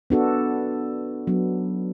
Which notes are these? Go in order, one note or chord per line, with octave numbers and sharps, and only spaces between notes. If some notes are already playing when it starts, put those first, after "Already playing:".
B3 D4 F#4 A4
F#3 B3 D4